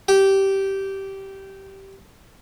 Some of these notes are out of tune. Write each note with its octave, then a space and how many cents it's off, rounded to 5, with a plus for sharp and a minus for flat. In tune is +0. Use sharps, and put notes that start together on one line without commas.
G4 -15